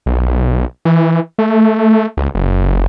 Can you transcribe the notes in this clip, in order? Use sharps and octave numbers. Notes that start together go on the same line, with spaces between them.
B1
E3
A3
C#2
F#1